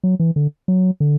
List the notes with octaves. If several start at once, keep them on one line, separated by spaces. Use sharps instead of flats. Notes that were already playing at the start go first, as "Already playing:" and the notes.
F#3
E3
D3
F#3
D3